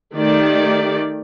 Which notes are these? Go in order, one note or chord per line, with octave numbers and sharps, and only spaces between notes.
D#3 A3 G4 D5